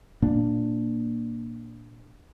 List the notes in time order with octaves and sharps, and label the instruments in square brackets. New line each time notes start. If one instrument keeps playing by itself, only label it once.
[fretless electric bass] A#2 A#3 D4